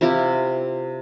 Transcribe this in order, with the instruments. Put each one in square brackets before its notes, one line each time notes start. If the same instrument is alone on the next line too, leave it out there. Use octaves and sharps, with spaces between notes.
[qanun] C3 E4 F4 G4